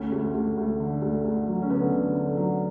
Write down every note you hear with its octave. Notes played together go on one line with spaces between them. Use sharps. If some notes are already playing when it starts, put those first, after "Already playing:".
Already playing: D2 C#4
D2
D2
D2
D3
D2
D2
F#3
C#4
D3 B3
D3
D3
F#3